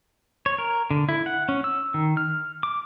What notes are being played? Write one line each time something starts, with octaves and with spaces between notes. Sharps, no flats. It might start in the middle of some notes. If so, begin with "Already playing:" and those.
C#5
A#4
D3
E4
F#5
C#4
E6
D#3
F6
D6